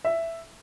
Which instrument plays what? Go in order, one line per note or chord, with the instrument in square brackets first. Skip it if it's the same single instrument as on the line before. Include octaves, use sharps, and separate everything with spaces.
[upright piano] E5